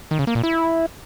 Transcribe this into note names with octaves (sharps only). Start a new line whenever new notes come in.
D#3
C#3
A#3
A#2
E4